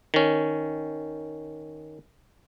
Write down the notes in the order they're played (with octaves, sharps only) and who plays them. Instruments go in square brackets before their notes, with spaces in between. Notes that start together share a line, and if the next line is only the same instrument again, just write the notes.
[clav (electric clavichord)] D#3 C#4